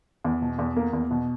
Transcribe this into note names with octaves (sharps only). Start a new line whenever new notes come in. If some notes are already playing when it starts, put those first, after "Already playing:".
E2
B2
E2
A#3
E2
B2